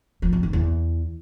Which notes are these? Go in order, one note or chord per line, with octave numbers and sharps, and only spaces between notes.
F3
F2
D#3
E2